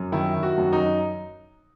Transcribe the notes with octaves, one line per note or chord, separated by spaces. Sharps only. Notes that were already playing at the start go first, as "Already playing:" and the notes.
Already playing: F#2
D#3 E4
D#3
F#4
F#2
D#4